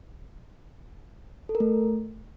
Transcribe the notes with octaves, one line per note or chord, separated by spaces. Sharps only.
A4
A#4
A3